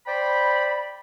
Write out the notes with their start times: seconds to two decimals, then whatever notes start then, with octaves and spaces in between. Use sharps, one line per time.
0.07 C5 D5 G5 B5